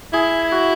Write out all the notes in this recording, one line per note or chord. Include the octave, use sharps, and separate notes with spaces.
E4 G#4
F#4